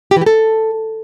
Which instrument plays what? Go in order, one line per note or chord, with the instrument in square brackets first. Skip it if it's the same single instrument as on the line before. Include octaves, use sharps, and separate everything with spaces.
[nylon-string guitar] G4
E3
G4
A4